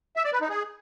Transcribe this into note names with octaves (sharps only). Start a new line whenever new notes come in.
E5
D5
B4
D#4
G#4